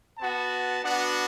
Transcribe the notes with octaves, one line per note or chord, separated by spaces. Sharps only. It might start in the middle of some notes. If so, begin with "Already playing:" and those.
B3 F#4 A5
B3 D4 F#4 F#5